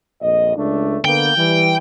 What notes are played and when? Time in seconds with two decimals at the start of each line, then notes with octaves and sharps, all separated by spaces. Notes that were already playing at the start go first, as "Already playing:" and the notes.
0.22 A#1 F2 D#5
0.57 C#2 A3 D4
1.05 D3 A#3 B3 G5
1.37 E3 G3